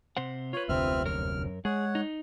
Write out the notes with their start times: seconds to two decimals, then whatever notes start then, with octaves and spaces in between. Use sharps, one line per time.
0.17 C3 C5 F#5
0.53 F4 B4 C#5
0.69 F1 D2 C3 C4 E5 F6
1.05 F#2 A#4 C#5 F6
1.65 G#3 G#4 C#5 F#5
1.95 D#4